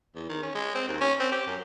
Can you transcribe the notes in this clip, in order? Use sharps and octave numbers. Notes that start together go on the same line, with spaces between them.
E2
D#3
C#4
G#3
C4
D#2
C#4
C4
G4
F#2